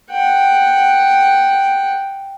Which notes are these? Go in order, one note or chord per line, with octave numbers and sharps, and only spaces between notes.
F#5 G5